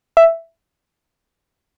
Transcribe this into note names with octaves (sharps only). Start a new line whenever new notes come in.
E5